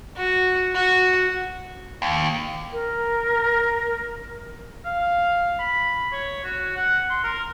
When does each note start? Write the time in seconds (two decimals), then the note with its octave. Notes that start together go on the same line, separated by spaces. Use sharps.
0.16 F#4
0.75 F#4
2.02 D#2
2.72 A#4
4.85 F5
5.59 B5
6.12 C#5
6.44 F#4
6.77 F#5
7.10 C6
7.24 A#4